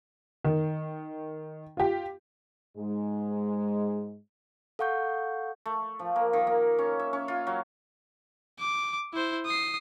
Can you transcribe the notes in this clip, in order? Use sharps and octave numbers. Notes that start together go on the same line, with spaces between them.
D#3
F4 G4
G#2 G#3
A4 F5 F#5 C#6 G6
A3
F3
A#3
D#3
A#3
C#4
E5
C#4
F4
F#3
D6
E4 C5
D#6 C7